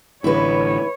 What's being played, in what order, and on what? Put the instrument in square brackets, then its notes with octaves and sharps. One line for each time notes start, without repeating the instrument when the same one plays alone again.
[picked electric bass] A1 D3 [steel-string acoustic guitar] E4 B4 [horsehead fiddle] C#5